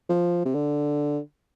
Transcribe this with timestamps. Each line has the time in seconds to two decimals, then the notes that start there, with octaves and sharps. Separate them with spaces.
0.09 F3
0.45 C3
0.55 D3